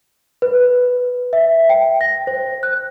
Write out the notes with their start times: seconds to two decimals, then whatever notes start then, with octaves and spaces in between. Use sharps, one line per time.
0.42 B4
1.33 E5
1.69 G5
2.01 A#6
2.27 C5
2.63 F#6